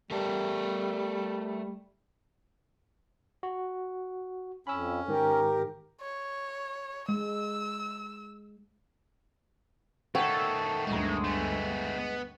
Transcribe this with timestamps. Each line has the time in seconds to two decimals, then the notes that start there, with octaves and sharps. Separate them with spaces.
0.11 G3 A3 A#4 A5
3.43 F#4
4.67 F2 C#4 B5 E6
5.08 G#2 D#3 G4 A#4
6.01 C#5
7.09 G#3 E6
10.15 D#3 A3 A4 C#5 F#5 G5
10.87 G1 D2 G#3
11.24 A3 B3
11.98 B3